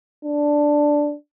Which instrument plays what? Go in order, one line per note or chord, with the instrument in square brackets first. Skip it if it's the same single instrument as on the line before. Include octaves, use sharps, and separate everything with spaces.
[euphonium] D4